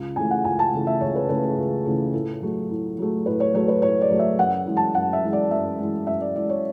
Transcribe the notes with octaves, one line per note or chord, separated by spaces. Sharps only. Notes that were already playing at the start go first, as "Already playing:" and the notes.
Already playing: C#2
C#3 E3 A3 G#5
F#5
C#2 G#5
A5
C#3 E3 A3
E5
C#2 C#5
B4
C#3 E3 A3 B4
G#4
C#2
C#3 E3 A3
A2 A4
F#3 A3
A2
F#3 A3
A2 B4
C#5
F#3 A3 C#5
B4
A2 C#5
D5
F#3 A3
E5
F#2 F#5
E3 G#3
A5
F#2 F#5
E5
E3 G#3
D5
F#2 E5
E3 G#3
F#2 E5
D5
E3 G#3 D5
C#5